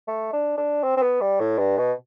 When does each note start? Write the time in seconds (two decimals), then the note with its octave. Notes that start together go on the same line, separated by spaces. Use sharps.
0.08 A3
0.33 D4
0.58 D4
0.84 C4
0.97 C4
1.02 B3
1.21 G3
1.40 A2
1.58 G2
1.78 B2